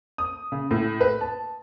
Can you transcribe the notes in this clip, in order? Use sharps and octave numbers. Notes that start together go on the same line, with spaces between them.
D#6
C#3
A2
B4
A5